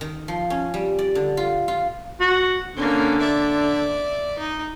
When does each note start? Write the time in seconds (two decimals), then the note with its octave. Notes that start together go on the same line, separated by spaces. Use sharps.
0.01 D#3
0.28 F3
0.50 C#4
0.74 G3
0.99 D5
1.15 D3
1.37 F4
1.68 F4
2.21 F#4
2.76 D3 A#3 C#4
3.20 D5 E5
4.39 D#4